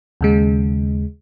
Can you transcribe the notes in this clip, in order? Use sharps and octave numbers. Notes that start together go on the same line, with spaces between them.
D#2 C#3 G#3